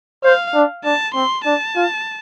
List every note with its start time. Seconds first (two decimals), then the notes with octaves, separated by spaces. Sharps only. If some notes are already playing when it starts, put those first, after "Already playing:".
0.24 C5 F5
0.54 D4
0.85 D4 A5
1.15 C4 C6
1.45 D4 A5
1.76 F4